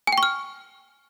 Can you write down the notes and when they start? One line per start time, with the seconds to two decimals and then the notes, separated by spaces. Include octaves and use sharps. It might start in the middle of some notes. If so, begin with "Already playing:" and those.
0.07 G#5
0.12 G5
0.18 C#6
0.23 F6